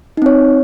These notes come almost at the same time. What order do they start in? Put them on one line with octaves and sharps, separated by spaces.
D#4 C4 C#5